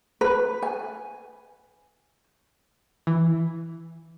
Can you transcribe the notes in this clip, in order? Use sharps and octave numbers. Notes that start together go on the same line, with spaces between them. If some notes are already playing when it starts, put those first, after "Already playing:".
B4
G#5
E3